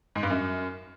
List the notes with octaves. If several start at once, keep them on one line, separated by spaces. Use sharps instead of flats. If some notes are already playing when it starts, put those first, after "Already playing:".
G#2
G2
F#2